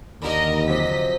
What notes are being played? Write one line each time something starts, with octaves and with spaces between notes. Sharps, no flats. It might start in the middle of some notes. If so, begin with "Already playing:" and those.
D#2 D3 D#4 A#4 D#5 B5
C3 F3 F#3 D#5 B6